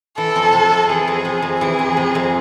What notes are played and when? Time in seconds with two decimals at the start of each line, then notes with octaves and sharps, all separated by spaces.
0.18 E3 A4
0.36 F2
0.53 C3
0.72 F2
0.89 E3 G#4
1.08 F2
1.25 C3
1.42 F2
1.60 E3 G#4
1.79 F2
1.97 C3
2.15 F2